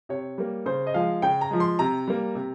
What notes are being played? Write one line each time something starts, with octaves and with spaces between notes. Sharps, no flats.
C3 C#5
G3 A#3
C#3 C5
D#5
F3 G#3 F5
C#3 G5
A#5
F3 G#3
C6
C3 A#5
G3 A#3
C3